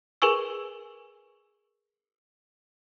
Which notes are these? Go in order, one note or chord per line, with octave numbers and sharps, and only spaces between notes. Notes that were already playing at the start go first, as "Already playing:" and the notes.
G#4 A#4 B4 G#5 C#6 E6